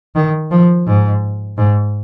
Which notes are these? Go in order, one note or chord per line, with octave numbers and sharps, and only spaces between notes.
D#3
F3
G#2
G#2